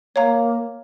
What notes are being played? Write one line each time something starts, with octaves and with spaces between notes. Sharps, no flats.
A#3 C#5 F5 A#5